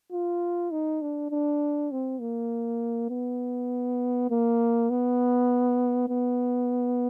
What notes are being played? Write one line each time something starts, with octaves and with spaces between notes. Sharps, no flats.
F4
D#4
D4
D4
C4
A#3
B3
A#3
B3
B3